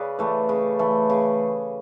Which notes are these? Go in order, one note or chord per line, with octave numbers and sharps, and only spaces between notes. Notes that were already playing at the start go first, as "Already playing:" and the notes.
Already playing: C#3 B4 D5
E3 A3
C#3
E3 A3
C#3